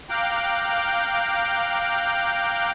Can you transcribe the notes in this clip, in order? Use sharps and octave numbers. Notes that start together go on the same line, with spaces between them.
F5 G5 A#5 D6 F#6 G6